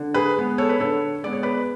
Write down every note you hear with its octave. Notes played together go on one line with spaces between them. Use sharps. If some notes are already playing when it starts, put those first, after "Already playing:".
Already playing: D3
G#4 B4
G#3 B3
A4 C#5
B4
D3 A4 C#5
G#3 B3 D5
C#5
B4 D5